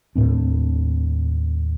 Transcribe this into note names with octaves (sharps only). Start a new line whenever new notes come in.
D#2 A2 C4 D4